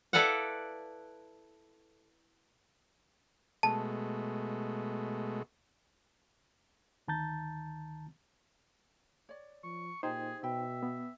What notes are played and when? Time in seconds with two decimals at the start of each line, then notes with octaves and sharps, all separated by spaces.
0.13 E4 A4 B4 D5 F5 F#5
3.63 B2 G#3 A3 A5
7.08 D2 D#3 A5 A#5 G6 A6
9.29 C#5 D5
9.64 F3 C#6
10.03 A#2 D#4 G4 G#4 C5
10.43 B2 E5 G5 B5
10.83 B3